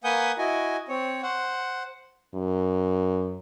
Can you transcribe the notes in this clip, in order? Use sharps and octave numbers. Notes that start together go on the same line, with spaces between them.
A#3 B4 F#5 G#5 D#6 G6
E4 F#4 D#5 G#5
C4 C#5
C5 F#5
F#2